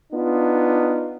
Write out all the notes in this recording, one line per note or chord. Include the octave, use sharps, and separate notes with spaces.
B3 D4 D#4 F4